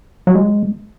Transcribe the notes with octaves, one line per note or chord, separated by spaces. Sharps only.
F#3
G#3